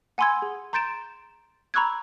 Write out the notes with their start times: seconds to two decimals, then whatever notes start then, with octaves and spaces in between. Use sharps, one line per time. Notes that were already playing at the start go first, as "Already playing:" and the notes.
0.18 F#5 G#5 B5 C6 E6 G#6
0.42 G#4
0.73 A#5 C6 G6 A6 D7 E7
1.74 A#5 B5 C#6 E6 F#6 G#6